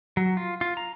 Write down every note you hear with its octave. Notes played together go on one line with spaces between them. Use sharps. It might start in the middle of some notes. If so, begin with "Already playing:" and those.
F#3
F4
F4
A#5